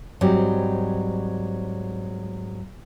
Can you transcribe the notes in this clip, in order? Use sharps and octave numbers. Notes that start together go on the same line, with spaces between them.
G#2 F#3 G3 C4